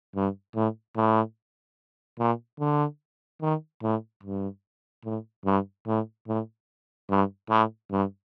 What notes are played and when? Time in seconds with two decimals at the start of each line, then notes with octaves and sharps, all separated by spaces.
0.16 G2
0.55 A2
0.96 A2
2.19 A#2
2.60 D3
3.42 D#3
3.83 A2
4.23 G2
5.05 A2
5.46 G2
5.87 A2
6.28 A2
7.10 G2
7.50 A2
7.91 G2